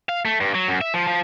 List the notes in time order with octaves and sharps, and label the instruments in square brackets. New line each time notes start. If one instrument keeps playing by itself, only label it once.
[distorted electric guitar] F5
A3
G2
F#3
F#2
E5
F3
F3